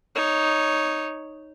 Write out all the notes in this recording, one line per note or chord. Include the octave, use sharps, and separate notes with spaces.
D#4 C#5